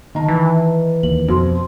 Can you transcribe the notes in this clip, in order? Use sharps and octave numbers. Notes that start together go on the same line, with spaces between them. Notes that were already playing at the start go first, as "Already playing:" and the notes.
D#3 D#5 A5 A#5
E3
D#2 F#7
F2 B2 C5 C6